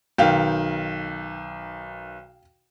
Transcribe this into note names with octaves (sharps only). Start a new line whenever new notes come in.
B1 D#3 F5 G5